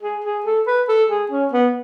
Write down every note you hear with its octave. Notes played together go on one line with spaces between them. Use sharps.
G#4
G#4
A4
B4
A4
G#4
C#4
B3